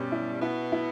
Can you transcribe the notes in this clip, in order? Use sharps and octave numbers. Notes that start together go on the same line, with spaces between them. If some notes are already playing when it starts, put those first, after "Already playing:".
Already playing: G2 B2 G3 C#4
E4
B2 B3 E4
E4